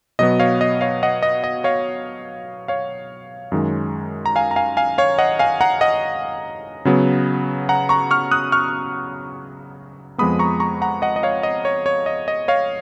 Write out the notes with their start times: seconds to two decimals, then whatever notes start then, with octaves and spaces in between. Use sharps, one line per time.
0.19 B2 F#3 B3 D#5
0.40 C#5 F5
0.61 D#5
0.81 C#5 F5
1.03 D#5 F#5
1.22 D#5
1.44 D#5
1.64 C#5 F5
2.68 C#5 F5
3.52 F#2 D#3 G#3
4.26 A#5
4.36 F5 G#5
4.51 A#5
4.56 F5 G#5
4.77 F5 G#5
4.98 C#5 F5
5.18 D#5 F#5
5.39 F5 G#5
5.61 F#5 A#5
5.81 D#5 F#5
6.85 C#3 F#3 B3
7.69 F#5 A#5
7.89 A#5 C#6
8.11 C#6 F6
8.31 D#6 F#6
8.52 C#6 F6
10.18 F2 F3 G#3 B3 B5 D#6
10.39 A#5 C#6
10.60 A#5 C#6
10.82 F#5 A#5
11.02 D#5 F#5
11.16 D#5
11.23 C#5 F5
11.43 D#5
11.65 C#5
11.86 C#5
12.06 D#5
12.28 D#5
12.48 C#5 F5